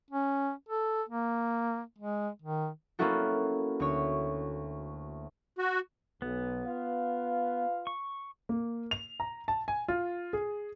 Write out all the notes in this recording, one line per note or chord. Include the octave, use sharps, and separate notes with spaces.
C#4
A4
A#3
G#3
D#3
A#3 B3 C#4 E4 F#4 A4
D2 C#5
F#4
B1 B3
F4 B4 F5
C#6
A#3
F7
A#5
A5
G#5
F4
G#4